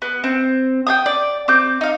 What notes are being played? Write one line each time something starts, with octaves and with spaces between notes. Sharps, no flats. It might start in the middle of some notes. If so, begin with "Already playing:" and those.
B3
C4
G5 G#5 D#6
D5
C4 D6 G6
D#4 F5